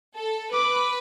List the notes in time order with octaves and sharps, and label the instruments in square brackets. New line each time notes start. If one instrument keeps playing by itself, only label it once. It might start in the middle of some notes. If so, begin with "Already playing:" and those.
[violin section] A4
[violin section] B4 [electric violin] D6